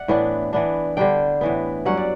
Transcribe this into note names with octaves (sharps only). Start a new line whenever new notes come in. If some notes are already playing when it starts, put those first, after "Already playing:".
Already playing: D5 E5 F#5
A2 E3 B3 D4
E3 B3 D4
D3 G3 D4 G5
A2 E3 B3
G2 F#3 C#4 F#5
D5